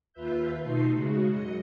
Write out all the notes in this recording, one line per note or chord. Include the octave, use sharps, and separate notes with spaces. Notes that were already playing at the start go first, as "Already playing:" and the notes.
D#2 F4 B4 E5 G6
B2 A3 D#4 C6 C7
C#3 G#3 F#4
F#2 D#5 C#7